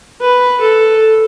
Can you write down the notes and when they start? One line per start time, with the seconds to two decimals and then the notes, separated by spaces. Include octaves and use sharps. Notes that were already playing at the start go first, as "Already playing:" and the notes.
0.20 B4
0.60 A4